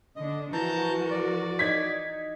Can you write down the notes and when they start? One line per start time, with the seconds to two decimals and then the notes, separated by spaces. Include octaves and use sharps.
0.16 D3 D4 D#5
0.53 E3 F3 F#4 A#4 A5 A#5 G6
1.11 D5
1.59 D#4 G#6 B6